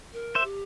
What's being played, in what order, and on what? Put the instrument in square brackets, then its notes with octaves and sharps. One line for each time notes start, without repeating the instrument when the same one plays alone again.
[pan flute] A#4
[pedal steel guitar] C5 E5
[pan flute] G4